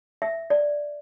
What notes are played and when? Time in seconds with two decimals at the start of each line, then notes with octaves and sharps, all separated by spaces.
0.22 E5
0.50 D5